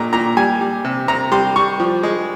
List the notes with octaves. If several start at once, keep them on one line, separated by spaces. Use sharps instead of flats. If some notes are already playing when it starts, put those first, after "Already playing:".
Already playing: A#2 G#3 A#5
A#2 A#5
G3 G#5
G3
C3
C3 A#5
G3 C6
G3 C#6
F3
G#3